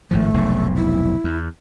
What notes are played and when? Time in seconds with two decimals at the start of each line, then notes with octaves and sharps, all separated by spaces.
0.11 G#1 A2 F3 A3
0.34 F1 B1 G#2
0.76 E4
1.24 E2